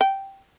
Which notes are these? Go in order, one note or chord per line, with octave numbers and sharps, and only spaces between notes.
G5